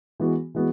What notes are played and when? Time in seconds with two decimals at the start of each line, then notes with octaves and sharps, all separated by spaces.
0.20 E3 G#3 B3 F#4
0.55 E3 G#3 B3 F#4